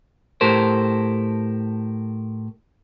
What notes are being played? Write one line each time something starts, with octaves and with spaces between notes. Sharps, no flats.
A2 G4 A4 A#4 C5